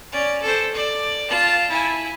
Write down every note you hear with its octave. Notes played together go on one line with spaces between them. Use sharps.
C#4 D5
A4 C5
D5
F4 A5
E4 G#5